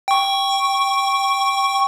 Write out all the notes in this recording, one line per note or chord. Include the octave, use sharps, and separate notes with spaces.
G5 C#6